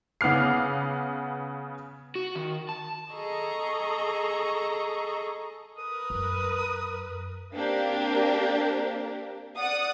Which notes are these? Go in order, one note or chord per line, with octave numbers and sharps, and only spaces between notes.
C#3 B3 D6 F6 C7
F#4
D#3
A5
G#4 A4 D#5 A#5 C#6
A#4 B4 D#6
F#2
A#3 C4 D4 G4 A#4
D5 F#5 D#6